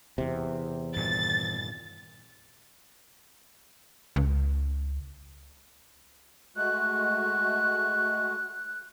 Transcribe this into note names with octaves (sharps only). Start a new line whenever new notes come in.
E2 C3
G2 A#2 D#3 A6
C#2
G#3 A3 F#4 F#6